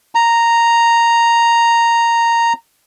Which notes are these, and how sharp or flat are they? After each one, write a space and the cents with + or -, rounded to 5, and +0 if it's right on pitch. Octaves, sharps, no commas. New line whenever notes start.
A#5 -5